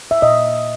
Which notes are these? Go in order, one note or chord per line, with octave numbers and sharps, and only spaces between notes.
E5
A#2 D#5